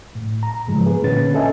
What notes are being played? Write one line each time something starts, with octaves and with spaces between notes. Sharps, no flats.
A2
A#5
G#2 C#3 E3 F3 G#3
B3 G#4 B4
A#2 D3 C#4 B4 A6
C#4 A4 D#5 E5 G#5